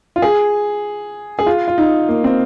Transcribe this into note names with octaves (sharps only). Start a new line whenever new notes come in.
F4
G#4
G#4
F4
F4
D#4
A#3
C4